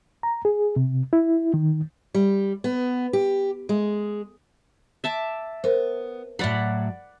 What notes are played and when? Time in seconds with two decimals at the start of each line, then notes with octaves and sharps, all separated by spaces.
0.23 A#5
0.45 G#4
0.76 C3
1.13 E4
1.54 D#3
2.14 G3
2.64 B3
3.13 G4
3.69 G#3
5.04 E5 A5 D6
5.64 B3 A#4 C5
6.39 A2 F#3 D5 F#5 B5